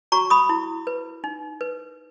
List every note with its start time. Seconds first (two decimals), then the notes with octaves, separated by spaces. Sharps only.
0.12 F#4 A#5 C#6
0.30 B5 D#6
0.49 E4
0.87 B4
1.24 D#4
1.61 B4